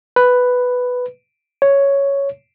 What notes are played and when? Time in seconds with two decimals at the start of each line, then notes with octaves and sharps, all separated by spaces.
0.16 B4
1.62 C#5